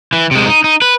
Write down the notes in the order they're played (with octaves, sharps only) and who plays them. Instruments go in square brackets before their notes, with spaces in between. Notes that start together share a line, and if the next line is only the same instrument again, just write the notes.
[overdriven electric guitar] E3
C3 G#3
D#4
D#4
B4